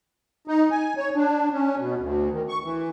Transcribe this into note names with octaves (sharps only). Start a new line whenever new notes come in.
D#4
G#5
C#5
D4
C#4
B2
D2
D#3
C#6
E3